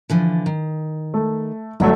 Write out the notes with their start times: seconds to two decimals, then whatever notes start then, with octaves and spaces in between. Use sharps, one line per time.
0.10 D3 E3 F3
0.46 D#3
1.14 A3
1.80 G1 F#3 A3 E4